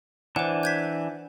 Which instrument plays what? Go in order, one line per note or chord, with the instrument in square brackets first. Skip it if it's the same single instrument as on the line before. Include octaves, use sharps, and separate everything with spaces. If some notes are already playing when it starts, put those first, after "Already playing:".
[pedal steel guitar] E3 D4 [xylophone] C5 F#5
[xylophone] G6 G#6 B6